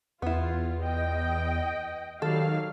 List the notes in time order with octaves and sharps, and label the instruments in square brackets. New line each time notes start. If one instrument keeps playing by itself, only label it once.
[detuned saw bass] E2 [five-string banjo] B3 E4 [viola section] F4
[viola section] D#5 G5
[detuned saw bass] D#3 [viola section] F#3 G3 F5 [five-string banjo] A4